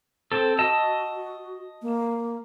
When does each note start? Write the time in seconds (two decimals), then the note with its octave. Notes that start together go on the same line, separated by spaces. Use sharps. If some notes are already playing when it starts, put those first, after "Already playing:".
0.32 C4 A4
0.59 F#4 D#5 A5 E6
1.82 A#3